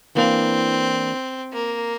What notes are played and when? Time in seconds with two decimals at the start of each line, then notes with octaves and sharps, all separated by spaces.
0.15 E3 A#3 C4 D4
1.53 A#3